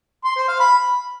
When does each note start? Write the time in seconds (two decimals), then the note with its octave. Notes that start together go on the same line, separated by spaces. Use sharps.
0.24 C6
0.36 C5
0.48 F5
0.60 B5